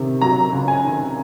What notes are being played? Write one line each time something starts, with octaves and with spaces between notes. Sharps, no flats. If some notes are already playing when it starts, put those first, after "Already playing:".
Already playing: C3 D#3
F#3 A#5
C#2
G#5
D#3